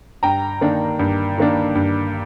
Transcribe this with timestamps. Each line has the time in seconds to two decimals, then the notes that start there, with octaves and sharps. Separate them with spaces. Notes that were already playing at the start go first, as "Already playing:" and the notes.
0.23 G2 G5 A#5
0.61 D#3 A#3 D4
0.99 G2
1.38 D#3 A#3 D4
1.75 G2